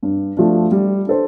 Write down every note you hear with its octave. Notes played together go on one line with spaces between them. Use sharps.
G2
F3 A3 D4
G3
D4 A4 C5